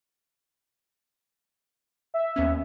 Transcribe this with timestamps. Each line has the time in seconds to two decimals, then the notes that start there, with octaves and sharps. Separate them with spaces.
2.14 E5
2.36 D#2 B3 C#4